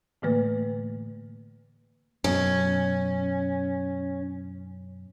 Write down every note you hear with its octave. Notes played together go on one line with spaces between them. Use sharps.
A2 D3 E3 A3 A#3 B4
F#2 B2 C#4